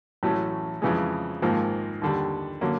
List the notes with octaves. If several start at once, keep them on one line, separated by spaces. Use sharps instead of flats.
A1 A2 F#3 A3 C#4
F2 C#3 E3 G#3
G#1 G#2 F3 A#3
D#2 D3 G3
D3 F#3 A#3 C#4